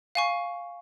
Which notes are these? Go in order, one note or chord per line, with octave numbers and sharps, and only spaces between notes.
F5 G#5 C#6